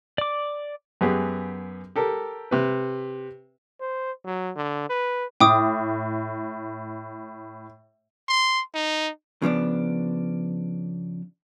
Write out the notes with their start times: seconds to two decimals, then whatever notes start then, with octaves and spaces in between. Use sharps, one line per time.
0.18 D5 D6
1.01 F#2 B3 G4 G#4
1.96 G4 A4 A#4
2.51 C3 B4
3.80 C5
4.25 F#3
4.56 D3
4.90 B4
5.40 A2 G5 D6 D#6
8.29 C6
8.74 D#4
9.42 C#3 F3 B3 D4